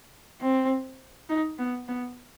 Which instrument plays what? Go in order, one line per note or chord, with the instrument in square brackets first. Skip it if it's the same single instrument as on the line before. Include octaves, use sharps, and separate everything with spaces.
[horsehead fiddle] C4
D#4
B3
B3